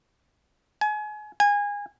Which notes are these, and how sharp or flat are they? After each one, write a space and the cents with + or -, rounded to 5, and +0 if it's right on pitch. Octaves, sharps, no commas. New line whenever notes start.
G#5 +30
G#5 -25